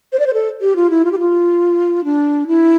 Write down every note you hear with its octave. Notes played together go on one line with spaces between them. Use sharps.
C5
D5
C5
A4
G4
F4
E4
F4
G4
F4
D4
E4